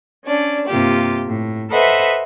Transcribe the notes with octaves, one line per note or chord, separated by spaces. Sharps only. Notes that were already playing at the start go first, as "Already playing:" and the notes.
C#4 D4 D5
G2 C3 A#3 F4 G4
A2
A4 B4 C5 D#5 E5 F#5